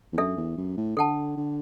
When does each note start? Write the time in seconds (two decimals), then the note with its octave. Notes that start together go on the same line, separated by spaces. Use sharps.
0.13 E2
0.18 F#2 D4 A4 E5
0.37 E2
0.57 F#2
0.77 A2
0.97 D3 A4 F#5 A5
1.37 D3